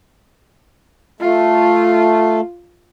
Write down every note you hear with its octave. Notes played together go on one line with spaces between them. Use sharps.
A3 F4